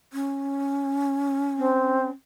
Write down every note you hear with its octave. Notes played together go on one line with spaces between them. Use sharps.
C#4
C4